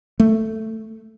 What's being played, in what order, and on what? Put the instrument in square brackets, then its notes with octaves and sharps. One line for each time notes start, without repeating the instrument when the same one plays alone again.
[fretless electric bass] A3